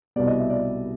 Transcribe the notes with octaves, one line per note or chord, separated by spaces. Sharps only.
C2 B2 G3 B3 D5
D#5
E5
D5